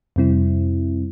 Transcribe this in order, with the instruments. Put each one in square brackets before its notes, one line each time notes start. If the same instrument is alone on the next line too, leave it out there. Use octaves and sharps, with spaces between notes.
[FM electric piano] F2 C3 G3 C4 E4